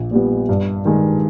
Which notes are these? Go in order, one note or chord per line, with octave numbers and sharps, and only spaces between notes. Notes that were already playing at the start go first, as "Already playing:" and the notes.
Already playing: A#1
A#2 G3 B3
G2
D#3 G#3